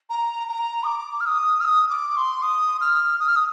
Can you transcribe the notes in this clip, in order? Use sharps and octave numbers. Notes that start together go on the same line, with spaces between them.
A#5
A#5
D#6
D6
F6
D#6
F6
D#6
D6
C6
D#6
F6
D#6
F6
D#6